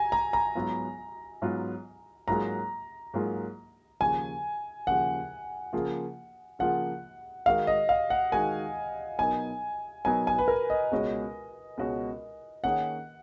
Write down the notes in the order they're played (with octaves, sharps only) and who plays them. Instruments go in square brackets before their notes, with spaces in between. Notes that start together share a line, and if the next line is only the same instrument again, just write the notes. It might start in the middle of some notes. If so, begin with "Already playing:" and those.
Already playing: [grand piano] G#5 A#5
A#5
A#5
[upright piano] G#2 F#3 B3 F4
G#2 F#3 B3 F4
[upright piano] G#2 F#3 A#3 F4 G#4 [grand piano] A#5
[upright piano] G#2 F#3 A#3 F4 G#4
[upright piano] D#2 C#3 F3 [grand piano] G#5
[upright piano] D#2 C#3 F3 [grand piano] F#5
[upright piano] C#3 F3 A#3 F4 G#4
[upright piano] C#3 F3 A#3 F4 G#4 [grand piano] F#5
[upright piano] D#3 G#3 D#4 F#4 A#4 [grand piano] F5
[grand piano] D#5
F5
F#5
[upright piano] D#3 G#3 D#4 F#4 A#4 [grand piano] G#5
[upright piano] B2 F#3 B3 D#4 A#4 [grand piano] G#5
[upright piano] B2 F#3 B3 D#4 A#4 [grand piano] G#5
[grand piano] G#5
B4
A#4
D#5
[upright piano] C#2 B2 G#3 C#4 F#4
C#2 B2 G#3 C#4 F#4
[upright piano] D#3 A#3 C#4 G#4 [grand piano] F#5